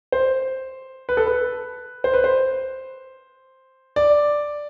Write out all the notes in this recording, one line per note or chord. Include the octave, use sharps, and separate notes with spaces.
C5
B4
A4
B4
C5
B4
C5
D5